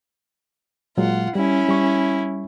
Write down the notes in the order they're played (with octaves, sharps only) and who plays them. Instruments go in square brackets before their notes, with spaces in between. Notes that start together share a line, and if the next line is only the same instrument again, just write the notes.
[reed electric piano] A#2 F#3 G#3 [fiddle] F4 F#5
[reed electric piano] G3 [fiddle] C#4 E4
[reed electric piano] G3 C#6